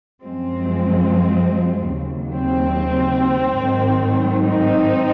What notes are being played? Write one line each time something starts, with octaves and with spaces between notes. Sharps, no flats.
F#2 F3 G#3 C4
D#2 C#3 F#3
C4
G#2 D#3 F#3
C4 D#4